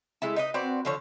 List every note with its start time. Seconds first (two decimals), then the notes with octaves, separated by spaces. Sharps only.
0.22 G#3 A3 E4
0.36 D#4 B4 D#5
0.54 C4 F#4 B4 D5
0.85 D3 F3 C#5